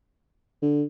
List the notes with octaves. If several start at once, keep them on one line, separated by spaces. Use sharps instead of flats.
D3